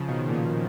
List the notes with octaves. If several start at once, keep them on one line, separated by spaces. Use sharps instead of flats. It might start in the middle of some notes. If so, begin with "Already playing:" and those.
Already playing: C#3 F3
B2 D#3
A#2 C#3